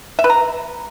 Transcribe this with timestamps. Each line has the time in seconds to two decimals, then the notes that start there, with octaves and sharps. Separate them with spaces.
0.19 E5
0.24 B4
0.30 A#5